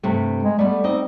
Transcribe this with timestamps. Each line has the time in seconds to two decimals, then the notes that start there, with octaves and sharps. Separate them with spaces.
0.03 G2 C3 A3
0.43 G#3
0.59 G3 A3 B3
0.84 C4 D#4 D#5